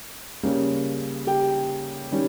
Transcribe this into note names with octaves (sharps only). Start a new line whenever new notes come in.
C#3 G3 A#3 C#4
G4 G5
D#3 G3 C#4